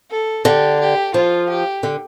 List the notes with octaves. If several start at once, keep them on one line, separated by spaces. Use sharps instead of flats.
A4
D3 G4
G4
F3 F4
G4
D3